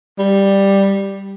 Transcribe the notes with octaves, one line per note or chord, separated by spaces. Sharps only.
G3